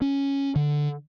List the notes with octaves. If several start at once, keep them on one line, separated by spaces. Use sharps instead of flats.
C#4
D3